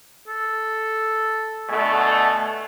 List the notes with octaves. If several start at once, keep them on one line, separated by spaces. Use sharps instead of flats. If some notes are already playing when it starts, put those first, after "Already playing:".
A4
B2 D3 A3 G#5